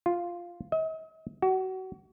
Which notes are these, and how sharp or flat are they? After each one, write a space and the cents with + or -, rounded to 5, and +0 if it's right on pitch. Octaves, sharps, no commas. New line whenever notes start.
F4 +0
D#5 +45
F#4 +30